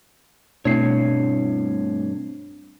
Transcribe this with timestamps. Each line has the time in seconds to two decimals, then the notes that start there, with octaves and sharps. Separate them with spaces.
0.65 G2 B2 A3 C4 D4 E4 C#5 C7